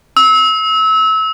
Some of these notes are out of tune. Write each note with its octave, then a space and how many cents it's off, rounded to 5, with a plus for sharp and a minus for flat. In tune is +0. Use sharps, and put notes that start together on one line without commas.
E6 -25